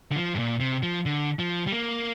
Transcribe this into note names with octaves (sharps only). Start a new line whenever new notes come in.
D3
F3
G2
A#2
C3
F3
D3
F3
G3
A#3